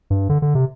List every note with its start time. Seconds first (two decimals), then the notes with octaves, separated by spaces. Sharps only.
0.10 G2
0.29 D3
0.42 D3
0.55 C3